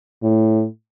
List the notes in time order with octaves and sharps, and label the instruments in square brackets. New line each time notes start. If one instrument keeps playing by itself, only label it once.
[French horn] A2